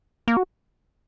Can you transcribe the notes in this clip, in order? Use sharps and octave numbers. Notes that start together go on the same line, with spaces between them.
A#3
F#4